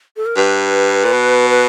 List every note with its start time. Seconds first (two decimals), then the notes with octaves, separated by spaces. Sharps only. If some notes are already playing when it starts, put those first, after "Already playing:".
0.17 A4
0.26 A#4
0.36 G2 B4
1.05 A#2
1.12 B2
1.50 B4